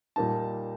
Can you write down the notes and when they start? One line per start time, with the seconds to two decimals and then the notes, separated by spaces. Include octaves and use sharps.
0.16 A#2 G3 A#3 D#4 A5